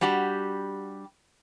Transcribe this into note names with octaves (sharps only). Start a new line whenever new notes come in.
G3 D4 F#4 G4